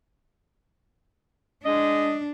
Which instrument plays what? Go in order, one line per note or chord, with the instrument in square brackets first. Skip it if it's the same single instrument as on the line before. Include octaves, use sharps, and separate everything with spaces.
[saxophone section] G#3 D#5 [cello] D4